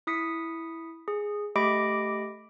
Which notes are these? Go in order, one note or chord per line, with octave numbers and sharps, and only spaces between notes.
E4 D#6 B6 C#7
G#4
A3 G4 D#5 B5 D6 D7